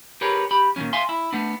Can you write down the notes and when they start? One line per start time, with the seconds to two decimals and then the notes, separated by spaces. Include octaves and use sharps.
0.21 G4 G#4 A#4 B4 C#5
0.51 G4 B5
0.76 A#2 D#3 F3 F#3 C#4
0.93 E5 F5 G#5 C6
1.09 E4
1.33 A3 B3 D4